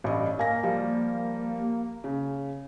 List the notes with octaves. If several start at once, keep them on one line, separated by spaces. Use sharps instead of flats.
A1 G2 D#5
A#3 G#5 A#6
F3 G3
C#3